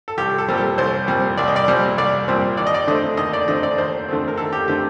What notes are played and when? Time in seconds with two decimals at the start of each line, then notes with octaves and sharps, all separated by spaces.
0.08 A4
0.17 C2 G4
0.38 A4
0.48 A#2 G3 C4 G4
0.57 A4
0.78 C2 C5
1.07 A#2 G3 C4
1.38 C2 D5
1.48 D#5
1.56 D5
1.68 A#2 G3 C4
1.98 C2 D5
2.28 A#2 G3 C4
2.57 D#2 D5
2.67 D#5
2.74 D5
2.87 D3 A3 C4 D#5
3.17 D#2 D#5
3.33 D5
3.48 D3 A3 C4 D#5
3.63 D5
3.78 D#2 C5
4.09 D3 A3 C4
4.28 A#4
4.37 D#2 A4
4.53 G4
4.68 D3 A3 C4 G4